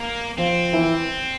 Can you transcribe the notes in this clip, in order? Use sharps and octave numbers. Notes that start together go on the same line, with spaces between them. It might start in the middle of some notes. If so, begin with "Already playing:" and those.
Already playing: A#3
F3 C4 F4
E3 E4